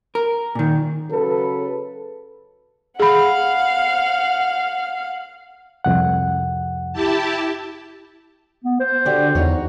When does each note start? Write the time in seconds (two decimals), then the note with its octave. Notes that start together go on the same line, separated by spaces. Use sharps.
0.15 A#4
0.55 A#2 D#3
1.10 C#3 F#3 A4 B4
3.00 G#4 F5 F#5 B5
5.84 C2 F2 F#5
6.93 E4 G4 A5
8.64 B3
8.80 C5
9.05 D3 F#4 G4 D5
9.35 E2 D#4 F#4 C#5